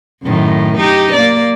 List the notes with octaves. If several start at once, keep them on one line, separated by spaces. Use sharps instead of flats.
F#2 A2 D#3
D#4 G4
A#3 D5